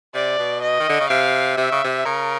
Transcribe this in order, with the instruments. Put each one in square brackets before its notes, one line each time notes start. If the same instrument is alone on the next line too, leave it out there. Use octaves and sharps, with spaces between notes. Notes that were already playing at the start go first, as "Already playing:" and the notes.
[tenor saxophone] C3 [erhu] D5
[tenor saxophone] B2
[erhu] D#5
[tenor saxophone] D#3
D3
C#3
[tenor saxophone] C3 [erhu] F5
[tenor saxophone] C3 [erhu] E5
[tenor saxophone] C#3
C3
[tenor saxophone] C#3 [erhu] A#4